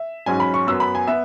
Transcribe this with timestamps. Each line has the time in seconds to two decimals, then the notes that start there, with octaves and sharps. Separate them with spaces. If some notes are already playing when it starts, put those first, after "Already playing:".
Already playing: E5
0.26 G#2 F#3 C#4 G#5
0.40 B5
0.54 C#6
0.67 F#2 F#3 B3 E6
0.80 B5
0.95 G#5
1.07 B3 E5